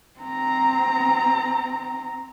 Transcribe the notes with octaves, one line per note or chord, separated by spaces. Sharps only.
C4 A#5